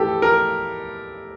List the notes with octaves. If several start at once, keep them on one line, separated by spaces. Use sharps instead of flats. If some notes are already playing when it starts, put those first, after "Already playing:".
Already playing: E3 A3 G4 A4
A#4